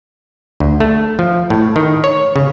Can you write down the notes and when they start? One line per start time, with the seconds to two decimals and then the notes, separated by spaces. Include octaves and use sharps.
0.60 D2
0.80 A3
1.19 F3
1.50 A2
1.76 D#3
2.04 C#5
2.36 C#3